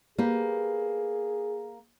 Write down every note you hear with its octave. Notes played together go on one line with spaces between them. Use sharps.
A#3 G4 G#4 B4